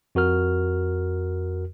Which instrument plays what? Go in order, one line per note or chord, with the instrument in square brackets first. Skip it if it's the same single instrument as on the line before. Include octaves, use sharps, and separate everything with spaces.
[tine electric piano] F2 F#4 A#4 F6